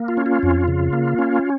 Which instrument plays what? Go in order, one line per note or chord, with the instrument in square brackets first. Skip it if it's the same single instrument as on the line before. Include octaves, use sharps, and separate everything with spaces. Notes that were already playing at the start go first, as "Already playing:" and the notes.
Already playing: [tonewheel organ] A#3
F4
C#4
F4
F2
C#3
A#3
C#4